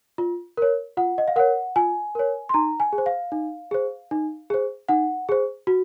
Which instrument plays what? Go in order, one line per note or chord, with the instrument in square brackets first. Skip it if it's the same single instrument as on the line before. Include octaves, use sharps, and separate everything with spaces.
[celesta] F4
A#4 C#5
F4 F#5
D#5
F5
A#4 C#5 F#5
F4 G#5
A#4 C#5
C6
D#4 A#5
G#5
G#4
C5
F5
D#4
G#4 C5
D#4
G#4 C5
D#4 F#5
G#4 C5
F#4